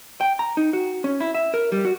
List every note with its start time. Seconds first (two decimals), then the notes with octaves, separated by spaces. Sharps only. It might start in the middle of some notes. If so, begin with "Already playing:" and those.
0.21 G5
0.39 A#5
0.57 D#4
0.73 F#4
1.04 C#4
1.20 E4
1.35 E5
1.54 A#4
1.72 G3
1.85 F#4